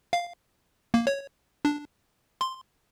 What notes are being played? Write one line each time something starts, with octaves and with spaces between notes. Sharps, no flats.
F5
A#3
C#5
D4
C6